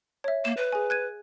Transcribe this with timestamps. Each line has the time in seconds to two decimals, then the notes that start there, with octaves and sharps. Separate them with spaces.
0.24 C#5 E5
0.45 A#3 E7
0.57 B4
0.72 G#4 G#5
0.90 F#6 G#6 D#7